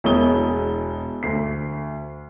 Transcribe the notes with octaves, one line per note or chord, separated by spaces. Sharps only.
E1 B2 G#3 E4 D#6 G7
D2 C7